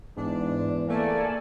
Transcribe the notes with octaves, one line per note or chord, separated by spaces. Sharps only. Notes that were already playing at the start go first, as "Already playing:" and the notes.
E2 G#2 D4
A3 A#3 A4 D5 G#5